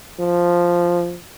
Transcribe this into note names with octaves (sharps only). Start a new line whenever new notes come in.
F3